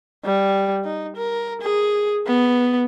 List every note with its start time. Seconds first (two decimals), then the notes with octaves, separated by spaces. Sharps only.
0.24 G3
0.84 D#4
1.16 A#4
1.61 G#4
2.27 B3